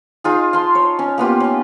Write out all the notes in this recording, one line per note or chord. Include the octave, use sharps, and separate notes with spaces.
D#4 F4 G#4
F5 A5 C6
C#5
C#4
A#3 B3 F4 G4
C#4 F5